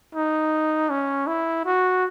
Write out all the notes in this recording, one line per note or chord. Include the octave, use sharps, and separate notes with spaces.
D#4
C#4
E4
F#4